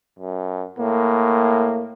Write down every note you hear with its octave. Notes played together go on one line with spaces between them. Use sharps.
F#2
A2 A#3